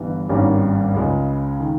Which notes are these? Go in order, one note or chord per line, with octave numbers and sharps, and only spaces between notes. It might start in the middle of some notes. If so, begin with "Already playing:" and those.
Already playing: G1 G2 E3 G3 B3
G#1 G2 G3 A#3 C#4
C#2 C#3 G#3
D#3